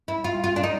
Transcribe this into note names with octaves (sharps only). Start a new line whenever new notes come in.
E4
F4
F4
D4
D#4